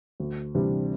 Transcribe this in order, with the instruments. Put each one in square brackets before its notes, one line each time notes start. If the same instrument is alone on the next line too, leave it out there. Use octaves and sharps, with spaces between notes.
[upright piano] D2
C3 E3 G3 D4